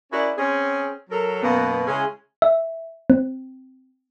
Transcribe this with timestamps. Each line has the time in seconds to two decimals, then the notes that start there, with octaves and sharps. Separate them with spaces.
0.12 C#4 E4 F#4 G#4 A#4 D5
0.38 C4 C#4 G#4
1.10 F#3 A4 A#4
1.42 F#2 B2 A#3 B3
1.87 C#3 G#3 C#4 E4 G#4
2.42 E5
3.10 C4